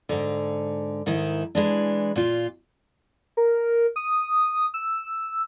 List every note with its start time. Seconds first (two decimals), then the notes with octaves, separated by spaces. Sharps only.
0.09 G#2 D3
1.06 G#2 D#3 D#4 E4
1.55 E3 G#3 D4
2.16 A#2 F4
3.37 A#4
3.96 D#6
4.74 E6